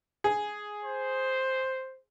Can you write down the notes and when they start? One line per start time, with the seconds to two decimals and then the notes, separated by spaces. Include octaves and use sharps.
0.24 G#4
0.84 C5